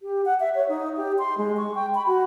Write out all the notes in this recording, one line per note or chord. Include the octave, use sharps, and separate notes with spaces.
G4
F#5
E5
C#5
D#4
G4
C6
G#3
C#6
G5
B5
F#4